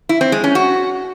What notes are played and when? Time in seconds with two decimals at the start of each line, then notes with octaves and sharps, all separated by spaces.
0.09 E4
0.21 C4
0.32 G#3
0.44 C#4
0.55 F#4